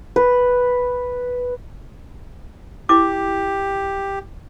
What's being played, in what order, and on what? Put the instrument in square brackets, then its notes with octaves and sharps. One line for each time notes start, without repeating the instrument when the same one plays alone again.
[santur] B4
[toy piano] E4 D6 [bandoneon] G4